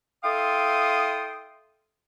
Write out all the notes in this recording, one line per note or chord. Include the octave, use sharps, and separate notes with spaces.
E4 A4 F5 G5 C6 D#6